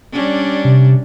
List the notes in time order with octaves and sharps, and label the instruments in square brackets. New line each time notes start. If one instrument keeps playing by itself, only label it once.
[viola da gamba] G3 C#4 D4
[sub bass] C3